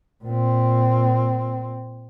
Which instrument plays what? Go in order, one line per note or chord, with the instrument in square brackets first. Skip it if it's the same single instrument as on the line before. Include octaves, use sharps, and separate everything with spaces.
[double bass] A#2 C4